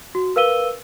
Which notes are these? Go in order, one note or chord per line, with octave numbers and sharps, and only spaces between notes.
F#4
A#4 B4 F5 E6 D#7 G7